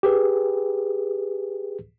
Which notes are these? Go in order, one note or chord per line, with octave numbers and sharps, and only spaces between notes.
G4 G#4 B4